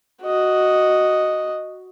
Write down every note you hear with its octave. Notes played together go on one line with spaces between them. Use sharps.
F#4 D#5